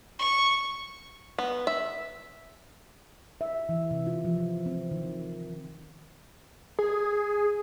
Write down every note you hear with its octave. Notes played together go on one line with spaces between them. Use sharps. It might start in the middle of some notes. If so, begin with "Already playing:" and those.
C#6
B3
E5
E5
E3
C3
F4
F3
C4
D#3
G#4